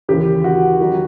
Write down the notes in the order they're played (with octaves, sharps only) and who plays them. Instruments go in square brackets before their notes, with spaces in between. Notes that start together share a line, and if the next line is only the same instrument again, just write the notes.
[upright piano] D#2 C#3 E3 G4
F#4
D#3 F#3